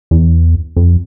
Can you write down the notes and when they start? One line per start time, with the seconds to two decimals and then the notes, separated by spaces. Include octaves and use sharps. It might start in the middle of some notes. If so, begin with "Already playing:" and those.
0.11 E2
0.76 F2